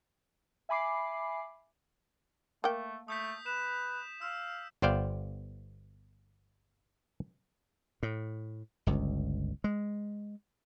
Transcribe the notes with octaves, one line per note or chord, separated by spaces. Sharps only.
E5 G#5 B5 D6 C7
A3 A#3 G5
A3 D#6 G6 B6
B4 E7
F5 E6
G1 B3 C5 D5 F5 G5
A2
G1 C#2
G#3